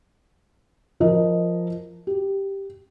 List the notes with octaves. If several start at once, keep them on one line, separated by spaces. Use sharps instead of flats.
F3 A#4 D#5
G4